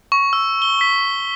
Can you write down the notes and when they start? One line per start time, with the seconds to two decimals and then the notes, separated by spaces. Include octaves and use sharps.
0.12 C#6
0.33 E6
0.62 G7
0.81 B6